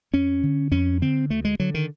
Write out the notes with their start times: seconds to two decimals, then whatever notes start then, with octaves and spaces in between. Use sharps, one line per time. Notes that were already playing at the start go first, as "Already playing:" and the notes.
0.13 F2 C#4
0.43 D3
0.71 F2 C#4
1.02 D3 C4
1.30 D2 A3
1.45 G#3
1.60 D3 F#3
1.74 D#3